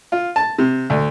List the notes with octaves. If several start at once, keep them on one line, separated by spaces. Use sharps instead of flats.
F4
A5
C3
D2